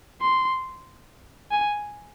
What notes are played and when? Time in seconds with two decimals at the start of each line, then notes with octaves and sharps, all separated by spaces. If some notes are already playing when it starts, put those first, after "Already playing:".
0.22 C6
1.51 G#5